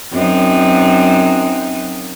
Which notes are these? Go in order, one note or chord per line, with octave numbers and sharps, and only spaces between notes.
F#2 C4 D#4